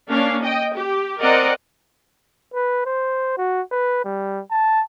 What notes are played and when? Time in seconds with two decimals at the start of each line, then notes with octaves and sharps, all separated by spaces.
0.10 A#3 C#4 D4 F5
0.43 D#5 G5
0.74 G4
1.21 C4 A#4 D5 D#5 F#5
2.54 B4
2.86 C5
3.38 F#4
3.72 B4
4.05 G3
4.51 A5